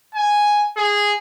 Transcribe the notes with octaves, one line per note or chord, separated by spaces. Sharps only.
G#5
G#4